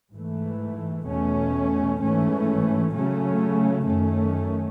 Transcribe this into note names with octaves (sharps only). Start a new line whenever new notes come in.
G#2 E3 A3
E2 B2 A3 C#4
G#2 E3 A3 C#4
C#3 F#3 A3 C#4
F#2 D#3 A3 C#4